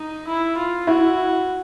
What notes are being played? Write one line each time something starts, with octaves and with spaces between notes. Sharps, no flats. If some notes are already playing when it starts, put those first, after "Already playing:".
Already playing: D#4
E4
F4
E4 F#4